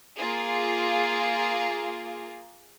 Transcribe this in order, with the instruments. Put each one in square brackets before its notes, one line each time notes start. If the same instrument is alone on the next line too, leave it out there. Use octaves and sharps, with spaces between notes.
[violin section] A#3 F4 G#4